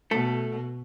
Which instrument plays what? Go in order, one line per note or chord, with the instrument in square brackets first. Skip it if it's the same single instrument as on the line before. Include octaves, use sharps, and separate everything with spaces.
[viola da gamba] B2 [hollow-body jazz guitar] A3 A4